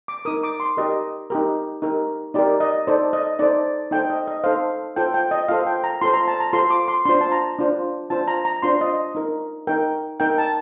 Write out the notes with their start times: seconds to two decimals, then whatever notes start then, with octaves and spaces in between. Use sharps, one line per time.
0.08 D6
0.25 D#4 A#4 D#6
0.43 D6
0.60 C6
0.77 D#4 G4 A#4 D#5
1.30 D#4 G4 A#4
1.82 D#4 G4 A#4
2.34 D#4 G4 A#4 D5
2.60 D#5
2.87 D#4 A4 C5 D5
3.13 D#5
3.39 D#4 A4 C5 D5
3.91 D#4 A4 C5 G5
4.10 D#5
4.27 D#5
4.44 D#4 A4 C5 F5
4.96 F4 A4 C5 G5
5.14 G5
5.31 D#5
5.48 F4 A4 C5 F5
5.67 G5
5.84 A#5
6.01 F4 A4 C5 C6
6.14 A#5
6.28 A5
6.40 A#5
6.53 F4 A4 C5 C6
6.70 D6
6.88 C6
7.05 D4 F4 C5 C6
7.21 A5
7.32 A#5
7.59 D4 F4 C5
8.10 D4 F4 C5 A5
8.28 A#5
8.45 A#5
8.62 D4 F4 C5 C6
8.81 D#5
9.15 D#4 A#4
9.67 D#4 A#4 G5
10.20 D#4 A#4 G5
10.38 A5